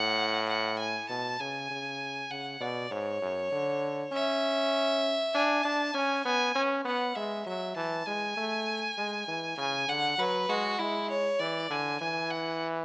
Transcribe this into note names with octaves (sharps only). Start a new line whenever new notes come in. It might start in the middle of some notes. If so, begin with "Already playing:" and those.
Already playing: A2 F#5
F#5
G#5
B2 A5
C#3 G#5
C#3
C#3 F#5
B2 D5
G#2 C#5
F#2
D3
C#4 E5
D4 G#5
D4 A5
C#4 G#5
B3 G#5
C#4
B3 F#5
G#3 E5
F#3 E5
E3 A5
G#3 G#5
A3
G#3
E3
C#3 G#5
D3 F#5
F#3 B4
G#3 F#4
G#3 E4
C#5
E3 D5
D3 G#5
E3 G#5
F#5